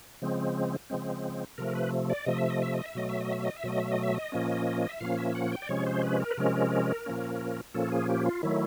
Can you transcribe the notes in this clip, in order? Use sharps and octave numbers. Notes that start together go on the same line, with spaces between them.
C#3 F3 G#3 C4
C#3 F3 G#3 C4
C3 F3 A3 A#4
B4
D5
C3 F3 A3 D#5
E5
D#5
E5
D#5
E5
B2 F#3 A3 D#5
E5
D#5
E5
D#5
E5
B2 F#3 A3 D#5
E5
D#5
E5
D#5
A#2 F3 A#3 C#4
E5
A#2 F3 A#3 C#4 F5
E5
F#5
G5
D5
C3 F3 G#3 C#4 C#5
C5
B4
A#4
B4
C3 F3 G#3 C#4 A#4
A#2 F3 A#3 C#4
A#2 F3 A#3 C#4 A4
G#4
G4
F4
D#3 F#3 A3 E4